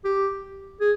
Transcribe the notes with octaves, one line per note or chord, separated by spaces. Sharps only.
G4
G#4